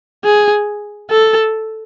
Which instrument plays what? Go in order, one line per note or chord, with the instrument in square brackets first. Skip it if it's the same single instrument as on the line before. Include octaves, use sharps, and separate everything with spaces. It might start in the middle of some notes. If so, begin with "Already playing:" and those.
[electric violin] G#4
A4